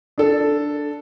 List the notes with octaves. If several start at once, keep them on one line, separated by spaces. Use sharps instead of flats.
D4 A4